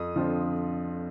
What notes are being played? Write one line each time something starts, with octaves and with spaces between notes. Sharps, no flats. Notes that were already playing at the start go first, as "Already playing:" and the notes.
Already playing: F2 D#6
D3 F3 C4 F4